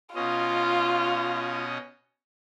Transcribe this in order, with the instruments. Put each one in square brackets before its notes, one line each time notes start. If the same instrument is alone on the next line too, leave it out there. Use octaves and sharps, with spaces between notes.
[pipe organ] B2 C#4 D#5 [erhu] F4